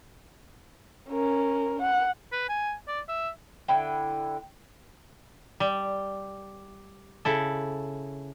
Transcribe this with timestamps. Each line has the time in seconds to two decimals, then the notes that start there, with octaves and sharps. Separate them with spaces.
1.09 C#4 A#4
1.81 F#5
2.33 B4
2.49 G#5
2.88 D5
3.08 E5
3.68 D3 E4 G5
5.60 G3
7.25 C#3 E4 A4